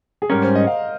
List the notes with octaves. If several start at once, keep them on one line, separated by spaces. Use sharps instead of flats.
G#4
G#2 G3 C#4 A#4
C5
D#5
F5